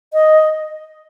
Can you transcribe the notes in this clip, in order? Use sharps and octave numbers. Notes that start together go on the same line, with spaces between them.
D#5